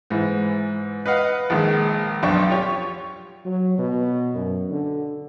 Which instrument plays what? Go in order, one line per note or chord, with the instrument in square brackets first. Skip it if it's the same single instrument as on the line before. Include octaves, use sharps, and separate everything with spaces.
[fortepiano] G#2 E3
B4 D#5 F5 F#5
A#1 D#3 G#3
B1 F2 D4 G5 C#6
F4 G4 C#5
[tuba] F#3
B2
F#2
D3